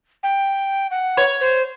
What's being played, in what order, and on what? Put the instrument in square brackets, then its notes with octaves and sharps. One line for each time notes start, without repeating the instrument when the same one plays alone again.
[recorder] G5
F#5
[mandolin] C#5
[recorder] C5